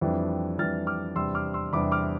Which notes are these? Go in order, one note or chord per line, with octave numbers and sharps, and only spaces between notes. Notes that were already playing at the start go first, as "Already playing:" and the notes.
F2 E3 G3 D4
F2 E3 G3 D4 F6 A6
D6 F6
E2 C3 G3 D4 C6 E6
D6 F6
C6 E6
E2 C3 G3 D4 B5 D6
D6 F6